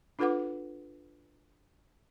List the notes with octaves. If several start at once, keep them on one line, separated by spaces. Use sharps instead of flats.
D4 F4 A4 B4 F#5 D6